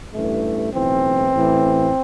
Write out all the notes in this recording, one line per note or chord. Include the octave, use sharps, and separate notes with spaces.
A1 G2 E3 A3
B1 A2 E3 C4
A1 A2 E3